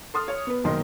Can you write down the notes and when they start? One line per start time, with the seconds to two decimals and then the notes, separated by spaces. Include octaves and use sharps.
0.14 A4 C6 D#6 F6
0.28 C#5
0.47 B3 B4
0.64 F#1 B1 D#3 A#4 D#5 C6